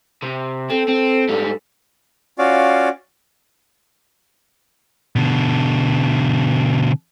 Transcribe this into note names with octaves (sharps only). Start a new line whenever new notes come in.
C3
C4 A4
C4
G#2 G3
C#4 F4 F#4 D5 F5
B2 D3